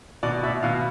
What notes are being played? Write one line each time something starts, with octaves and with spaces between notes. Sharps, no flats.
B2 D5
B2 E5
B2 F5